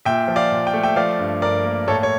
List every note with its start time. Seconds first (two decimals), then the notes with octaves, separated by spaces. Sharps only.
0.05 A#2 E5 G5
0.28 F3
0.36 D5 F5
0.52 A#2
0.67 G5
0.73 A3
0.83 E5 G5
0.96 F3 D5 F5
1.19 G2
1.42 G2 A#4 D5
1.65 A#3
1.88 A2 A4 C#5
2.03 C#5